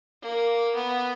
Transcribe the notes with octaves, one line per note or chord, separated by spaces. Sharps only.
A#3
B3